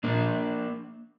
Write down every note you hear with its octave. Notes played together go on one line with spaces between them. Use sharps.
A#2 F3 A#3 D4